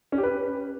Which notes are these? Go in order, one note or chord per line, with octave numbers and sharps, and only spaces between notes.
C#4
G4
B4